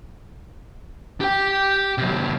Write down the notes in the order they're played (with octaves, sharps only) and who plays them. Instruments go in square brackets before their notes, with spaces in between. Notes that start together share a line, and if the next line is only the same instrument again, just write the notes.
[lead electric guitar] G4 G5
C3 F#3